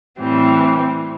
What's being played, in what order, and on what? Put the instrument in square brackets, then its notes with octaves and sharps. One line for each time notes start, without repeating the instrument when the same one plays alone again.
[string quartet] A2 E3 G3 C4